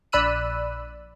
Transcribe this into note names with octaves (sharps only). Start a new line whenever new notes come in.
A#1 D5 B5 E6 F#6 D#7